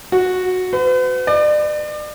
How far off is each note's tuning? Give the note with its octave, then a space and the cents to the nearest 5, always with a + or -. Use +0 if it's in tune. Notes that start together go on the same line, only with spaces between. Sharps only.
F#4 -10
B4 +45
D5 +35